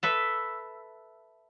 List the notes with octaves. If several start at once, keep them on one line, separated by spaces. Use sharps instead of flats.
A4 B4 E5